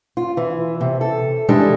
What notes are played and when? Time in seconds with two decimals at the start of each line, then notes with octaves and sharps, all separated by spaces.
0.17 F4
0.37 E3
0.81 C3
1.01 A4
1.49 E3 G3 G#3 D4 A4